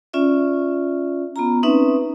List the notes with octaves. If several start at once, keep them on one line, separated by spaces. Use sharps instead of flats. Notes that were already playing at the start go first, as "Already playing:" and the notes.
C#4 F4 D5 E5
B3 F4 A#5
C4 C#4 D#4 B4 E5